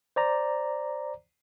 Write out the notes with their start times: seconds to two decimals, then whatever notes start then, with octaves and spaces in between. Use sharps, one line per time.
0.16 C5 D5 A#5